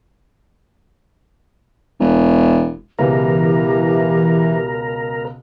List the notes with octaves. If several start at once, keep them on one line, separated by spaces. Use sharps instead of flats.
E1
C#2 B2 E3 G4 A#4